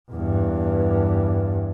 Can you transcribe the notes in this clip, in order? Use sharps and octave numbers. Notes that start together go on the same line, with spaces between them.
E2 G2